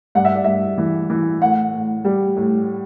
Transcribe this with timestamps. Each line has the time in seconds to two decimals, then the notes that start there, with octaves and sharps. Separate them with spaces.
0.15 G2 F#5
0.25 E5
0.35 D5
0.44 G2 E5
0.78 E3
1.10 E3
1.42 A2 F#5
1.74 A2
2.05 G3
2.36 A2